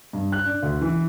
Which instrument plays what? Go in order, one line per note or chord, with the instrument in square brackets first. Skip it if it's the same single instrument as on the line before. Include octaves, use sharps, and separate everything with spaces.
[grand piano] G2
F#6
D4
D2
E3